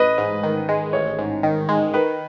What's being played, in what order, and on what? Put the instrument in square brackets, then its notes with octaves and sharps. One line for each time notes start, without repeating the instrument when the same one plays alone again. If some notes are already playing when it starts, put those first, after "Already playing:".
Already playing: [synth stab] A1 [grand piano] B4 D#5
[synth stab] G#2
D#3
G#3
[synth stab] A1 [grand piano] C#5
[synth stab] G#2
D#3
G#3
[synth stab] D#3 [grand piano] B4